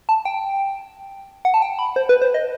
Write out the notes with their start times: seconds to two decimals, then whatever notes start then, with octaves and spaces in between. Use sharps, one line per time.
0.09 A5
0.25 G5
1.45 F#5
1.54 A5
1.62 G5
1.79 B5
1.96 C5
2.09 B4
2.22 C5
2.34 D#5